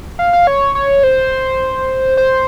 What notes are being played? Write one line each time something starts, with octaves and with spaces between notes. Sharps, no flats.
F5
F5
C#5
C#5
C5
C5